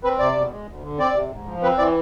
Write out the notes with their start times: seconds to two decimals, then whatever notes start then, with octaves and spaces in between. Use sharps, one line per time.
0.04 C4 B4
0.19 C3 D5
0.36 B2
0.51 G#3
0.67 D2
0.83 D3
0.98 C4 D5
1.14 C3
1.30 G#2
1.46 F3
1.62 C4 B4
1.78 E3 D5